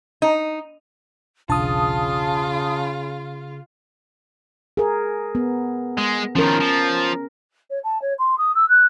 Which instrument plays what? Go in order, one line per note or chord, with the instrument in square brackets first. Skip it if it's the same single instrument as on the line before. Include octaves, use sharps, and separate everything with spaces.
[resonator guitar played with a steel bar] D#4
[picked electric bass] E1 B1 D4 [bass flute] C#3 [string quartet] F4 [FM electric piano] A5 D#6
[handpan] G#4 A#4
B3
[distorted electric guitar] G#3
[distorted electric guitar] D#3 F3 [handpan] C#4 A#4
[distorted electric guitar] F3
[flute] C#5
A5
C#5
C6
D#6
E6
F#6